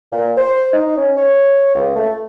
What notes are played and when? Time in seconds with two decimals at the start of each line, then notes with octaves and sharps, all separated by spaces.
0.13 A#2
0.37 C5
0.74 D#4
0.96 C#4
1.17 C#5
1.75 C#2
1.96 A3